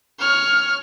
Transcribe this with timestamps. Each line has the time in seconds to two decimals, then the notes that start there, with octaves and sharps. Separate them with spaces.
0.19 C#5 F6